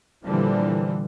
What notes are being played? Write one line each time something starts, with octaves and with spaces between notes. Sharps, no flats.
A#2 D3 E3 F3 G3